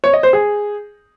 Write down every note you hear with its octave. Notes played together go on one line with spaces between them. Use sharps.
C#5
D#5
C5
G#4